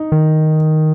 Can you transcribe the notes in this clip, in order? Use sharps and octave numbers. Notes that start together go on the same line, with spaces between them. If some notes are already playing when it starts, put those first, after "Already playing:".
Already playing: D#4
D#3